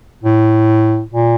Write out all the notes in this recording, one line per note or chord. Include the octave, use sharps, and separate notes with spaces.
A2
A#2